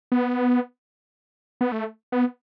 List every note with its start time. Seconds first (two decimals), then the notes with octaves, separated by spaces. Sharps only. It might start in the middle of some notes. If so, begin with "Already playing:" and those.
0.12 B3
1.61 B3
1.72 A3
2.12 B3